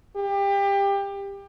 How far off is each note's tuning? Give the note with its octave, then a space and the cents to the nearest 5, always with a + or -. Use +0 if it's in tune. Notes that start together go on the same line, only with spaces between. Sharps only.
G4 +25